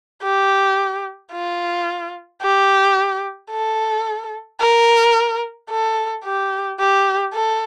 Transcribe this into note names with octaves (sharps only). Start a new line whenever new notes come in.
G4
F4
G4
A4
A#4
A4
G4
G4
A4